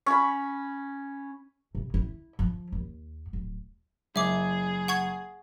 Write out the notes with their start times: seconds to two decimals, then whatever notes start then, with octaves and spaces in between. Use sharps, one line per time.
0.06 C#4 B5
1.75 C3
1.94 E4
2.39 F3
2.72 D#2
3.33 D1
4.16 F#1 G#4 E5 D6
4.88 F#5 C#6 G#6